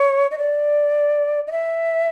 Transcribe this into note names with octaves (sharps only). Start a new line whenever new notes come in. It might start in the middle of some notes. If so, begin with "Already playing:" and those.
Already playing: C#5
D#5
D5
D#5
E5